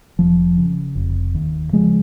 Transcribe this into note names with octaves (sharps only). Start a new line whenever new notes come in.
F1 F3
C#3
F1
D#2
C#3 F3 G#3